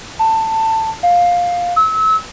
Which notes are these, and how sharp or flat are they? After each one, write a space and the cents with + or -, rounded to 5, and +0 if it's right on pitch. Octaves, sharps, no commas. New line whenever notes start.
A5 +20
F5 +10
E6 -30